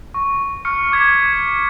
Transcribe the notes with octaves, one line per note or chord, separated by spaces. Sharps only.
C#6
C#6 F6 C#7
C#6 D6 G#6 B6